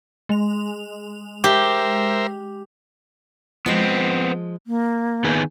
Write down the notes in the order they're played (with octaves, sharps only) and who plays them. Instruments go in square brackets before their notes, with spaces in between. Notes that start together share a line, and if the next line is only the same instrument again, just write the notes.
[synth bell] G#3 F7
[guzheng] G4 [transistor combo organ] A#4 C5 E5
[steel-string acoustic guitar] F3 G#3 [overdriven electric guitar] B3 C4
[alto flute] A#3
[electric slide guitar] D#3 B3 G#4